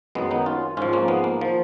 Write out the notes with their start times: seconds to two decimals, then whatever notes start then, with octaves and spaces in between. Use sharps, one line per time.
0.15 F#2 D#3 F#3 G#3 B3
0.31 B3 D#4
0.46 C#4 F4
0.77 G#2 F3 C#4 F4
0.93 A#3 C#4
1.08 G#3 B3
1.24 A#3
1.41 F3